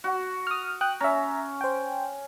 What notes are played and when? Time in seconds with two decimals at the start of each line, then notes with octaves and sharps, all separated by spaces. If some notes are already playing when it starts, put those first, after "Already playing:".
0.04 F#4
0.47 D#6 F6
0.81 G5 D#6 F#6
1.01 C#4 E5 A#5
1.61 C5 G5